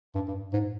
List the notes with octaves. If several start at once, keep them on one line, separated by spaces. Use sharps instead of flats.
G2
G2
G#2